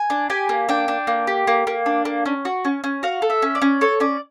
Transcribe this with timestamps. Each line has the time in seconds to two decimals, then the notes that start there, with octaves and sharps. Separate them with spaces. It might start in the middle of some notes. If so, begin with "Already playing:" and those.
Already playing: G#5
0.10 D4
0.30 G4 G#5
0.49 A#3
0.69 D4 G5
0.88 D4
1.07 A#3
1.27 G4
1.47 A#3
1.67 A#3
1.86 D4
2.05 A#3
2.26 C#4
2.45 F#4
2.65 C#4
2.84 C#4
3.03 F#4 F5
3.22 A4
3.30 E5
3.42 C#4
3.55 D5
3.62 C#4
3.81 A4 C#5
4.00 C#4 D5